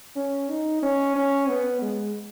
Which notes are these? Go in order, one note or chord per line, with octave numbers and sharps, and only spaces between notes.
C#4
D#4
C#4
C#4
B3
G#3